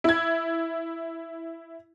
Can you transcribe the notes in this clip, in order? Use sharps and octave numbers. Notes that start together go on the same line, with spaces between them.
E4 G#6